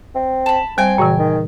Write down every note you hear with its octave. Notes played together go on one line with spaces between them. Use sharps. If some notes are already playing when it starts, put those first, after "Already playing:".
C4
A5 B5
G3 C4 G5 G#5
A#2 C#3 E3 F#3
D#3